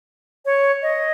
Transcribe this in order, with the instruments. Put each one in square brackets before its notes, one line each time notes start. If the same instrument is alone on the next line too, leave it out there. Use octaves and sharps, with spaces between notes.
[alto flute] C#5
D#5